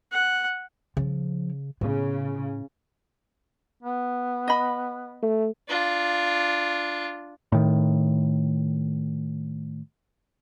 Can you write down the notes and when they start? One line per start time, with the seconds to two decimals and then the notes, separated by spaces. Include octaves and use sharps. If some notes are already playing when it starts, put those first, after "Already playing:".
0.12 F#5
0.97 C#3 F3
1.81 A2 C#3 B3
3.83 B3
4.48 D#5 B5
5.22 A3
5.68 D4 F4
7.52 A2 D#3